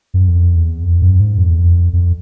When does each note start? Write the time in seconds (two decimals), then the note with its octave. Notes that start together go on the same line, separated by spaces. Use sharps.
0.14 F#2
0.27 F2
0.56 E2
0.83 F2
1.02 F#2
1.20 G#2
1.38 F2
1.49 E2
1.58 F2
1.93 F2